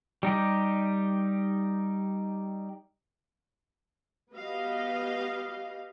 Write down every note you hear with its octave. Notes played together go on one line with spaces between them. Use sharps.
G3 D#4 G4
B3 F#4 G4 B4 D#5 F5